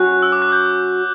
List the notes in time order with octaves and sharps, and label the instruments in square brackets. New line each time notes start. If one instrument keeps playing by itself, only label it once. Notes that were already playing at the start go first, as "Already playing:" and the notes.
Already playing: [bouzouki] F#3 C#4 F#4 [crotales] F#6
[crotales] E6
D6
F#6
G6